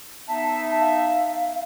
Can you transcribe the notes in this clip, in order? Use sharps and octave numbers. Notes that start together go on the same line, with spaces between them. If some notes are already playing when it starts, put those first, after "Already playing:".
B3 D#4 E5 A5
F5